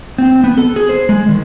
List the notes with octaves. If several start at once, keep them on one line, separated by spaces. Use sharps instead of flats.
C4
B3
A4
G#4
C5
G#3
D#3